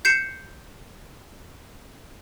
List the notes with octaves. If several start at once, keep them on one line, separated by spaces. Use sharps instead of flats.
G6 C7 C#7 E7